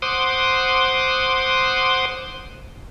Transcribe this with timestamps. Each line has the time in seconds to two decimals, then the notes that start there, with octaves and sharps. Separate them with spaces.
0.02 C5 F#5 C6 D6 D#6